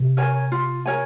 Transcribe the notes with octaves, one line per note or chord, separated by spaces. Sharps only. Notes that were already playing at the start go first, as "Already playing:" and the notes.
Already playing: C3
A#4 C#5 G#5
F4
A#4 C#5 G#5